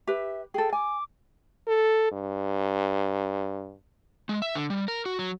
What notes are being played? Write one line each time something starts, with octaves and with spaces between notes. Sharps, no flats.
G4 B4 E5
G#4 A4 G5
G#5 D6
A4
G2
G#3
E5
D3
G3
A#4
F#4
F#3